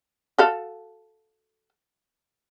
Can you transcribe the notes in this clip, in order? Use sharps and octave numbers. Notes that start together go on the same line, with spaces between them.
F#4 A4 F5